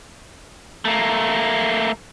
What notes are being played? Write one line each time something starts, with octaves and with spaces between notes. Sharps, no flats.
A3 A#3